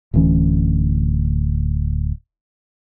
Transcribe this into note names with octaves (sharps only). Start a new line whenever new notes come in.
D1 D2 E3 C#4